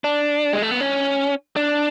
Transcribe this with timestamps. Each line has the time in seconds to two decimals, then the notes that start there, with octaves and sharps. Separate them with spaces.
0.04 D4
0.53 G#3
0.62 A3
0.71 B3
0.81 C#4
1.56 D4